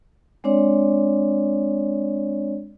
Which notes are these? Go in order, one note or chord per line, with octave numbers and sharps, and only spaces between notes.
G#3 C4 D4 C#5 D5